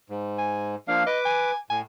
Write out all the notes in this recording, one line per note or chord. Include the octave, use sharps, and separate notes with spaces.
G#2
G#5
F3 A#3 D4 F5
B4 D#5 D6
G#5
A2 G#5